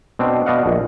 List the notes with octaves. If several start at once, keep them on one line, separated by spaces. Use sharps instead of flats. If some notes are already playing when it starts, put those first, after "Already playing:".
B2 C4 D4
B2 D5 D#5 F5 F#5
A#1